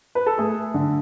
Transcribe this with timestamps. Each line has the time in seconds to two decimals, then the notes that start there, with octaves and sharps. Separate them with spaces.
0.15 B4
0.26 A4
0.38 A3 G#4
0.74 D3